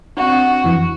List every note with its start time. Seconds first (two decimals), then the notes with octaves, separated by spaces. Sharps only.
0.17 C4 D4 F#4
0.64 F2 E3